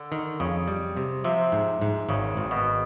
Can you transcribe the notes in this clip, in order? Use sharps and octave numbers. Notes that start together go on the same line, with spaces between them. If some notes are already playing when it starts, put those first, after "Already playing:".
Already playing: D3
D#3
F2 C#3
G3
C3
C3 F3
G#2
G#2
G#1 C#3
G#1
B2